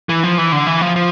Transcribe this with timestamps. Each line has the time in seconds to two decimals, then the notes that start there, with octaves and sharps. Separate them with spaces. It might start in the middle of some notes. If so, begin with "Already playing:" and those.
0.09 E3
0.24 F3
0.38 E3
0.52 D3
0.67 E3
0.81 F3
0.96 F3